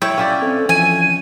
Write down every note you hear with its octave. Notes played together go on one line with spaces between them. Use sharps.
E4 C#5 G5
C#4 E4 D5 F5
C4 A4
E3 F3 G#5 D#7